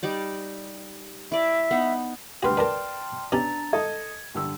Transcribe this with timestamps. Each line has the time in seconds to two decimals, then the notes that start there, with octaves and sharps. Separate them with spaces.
0.03 G3 D#4 D5
1.32 E4 D5 E5
1.71 B3 D#4
2.43 D2 G3 F#4 B4 G5 C6 F6
2.57 A#4 B4 D5 A5
3.32 B2 C#4 D4 G4 A#5 A6
3.73 A4 D#5 D#6 G#6
4.35 G2 D3 E6